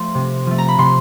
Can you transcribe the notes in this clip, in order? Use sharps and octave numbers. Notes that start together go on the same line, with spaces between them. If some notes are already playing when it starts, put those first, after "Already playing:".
Already playing: F3 A3 C6
C3
F3 A3
A#5
B5
C3 C6